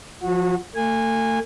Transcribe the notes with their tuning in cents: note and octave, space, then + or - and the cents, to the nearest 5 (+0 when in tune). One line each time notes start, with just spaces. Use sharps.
F3 +10 F#4 -25
A3 +40 G#5 -20